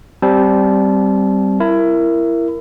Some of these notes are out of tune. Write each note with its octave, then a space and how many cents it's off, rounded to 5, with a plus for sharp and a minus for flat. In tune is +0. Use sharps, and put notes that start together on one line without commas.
G3 -5 C4 +5 A5 -25
E4 +20 A#4 -5